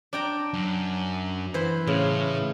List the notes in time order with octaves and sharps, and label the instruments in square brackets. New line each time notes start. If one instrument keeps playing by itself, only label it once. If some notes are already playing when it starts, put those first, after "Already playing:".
[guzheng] D4 G5 A#5
[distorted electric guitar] F#2
[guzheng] E3 C5
[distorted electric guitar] A2 [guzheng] C#3